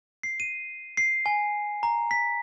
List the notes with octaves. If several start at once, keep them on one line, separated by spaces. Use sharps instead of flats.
C7
D#7
C7
G#5
A#5
B6